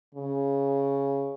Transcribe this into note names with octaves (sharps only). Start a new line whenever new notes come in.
C#3